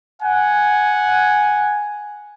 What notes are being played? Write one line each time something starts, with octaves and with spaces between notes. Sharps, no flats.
F#5 G#5